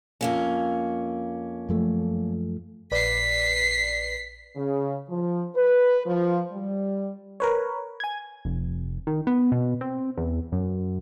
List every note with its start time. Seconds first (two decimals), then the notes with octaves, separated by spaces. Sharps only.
0.21 F2 A#3 C#4
1.69 F#2 F3 A3
2.91 A#1 B4 D5 B6 C7
4.57 C#3
5.09 F3
5.56 B4
6.06 F3
6.51 G3
7.40 A#4 B4 C#5
8.00 G#5 G#6
8.45 F1
9.07 D#3
9.27 B3
9.52 B2
9.81 C4
10.17 E2
10.52 F#2